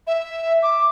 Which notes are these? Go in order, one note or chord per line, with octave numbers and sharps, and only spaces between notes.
E5
D6